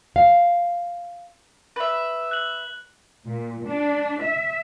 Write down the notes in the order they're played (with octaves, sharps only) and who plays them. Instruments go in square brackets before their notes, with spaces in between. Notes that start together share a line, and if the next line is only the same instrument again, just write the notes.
[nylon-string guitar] F5
[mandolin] B4 E5
[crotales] F#6 F#7
[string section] A#2
D4
E5